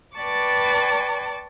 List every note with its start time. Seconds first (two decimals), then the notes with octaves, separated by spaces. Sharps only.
0.17 B4 D5 G5 A5 C#6 D6